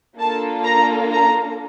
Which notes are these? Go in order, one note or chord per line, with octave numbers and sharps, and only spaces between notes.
A#3 D4 F4 A4 A5
A#5
A#5